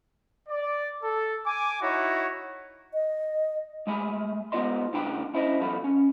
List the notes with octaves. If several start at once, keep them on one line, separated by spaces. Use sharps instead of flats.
D5
A4
G#5 D6
D#4 E4 F#4 C#5
D#5
G#3 A3 G#5 B5
G#3 B3 F4 D5 D#5 C6
A2 C#3 D4 G5 B5
C#4 E4 C5 D5 D#5
E2 F#3 F4 A4 B5
C#4